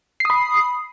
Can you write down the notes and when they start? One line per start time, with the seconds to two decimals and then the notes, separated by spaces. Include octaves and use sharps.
0.20 C7
0.25 D#6
0.30 B5